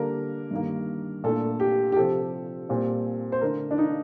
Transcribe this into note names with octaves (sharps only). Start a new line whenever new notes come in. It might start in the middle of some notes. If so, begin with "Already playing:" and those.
Already playing: D3 G3 A#3 D4 A#4
G2 D#3 A#3
A#2 A3 D4 A4
G4
G4
C3 F3 C4 A4
A#2 G3 C4
C5
D3 A3 D4 A#4
D4
D#4